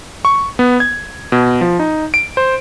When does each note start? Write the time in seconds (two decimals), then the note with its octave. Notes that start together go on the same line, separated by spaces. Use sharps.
0.25 C#6
0.59 B3
0.80 G#6
1.32 B2
1.61 F3
1.79 D#4
2.14 D7
2.37 C5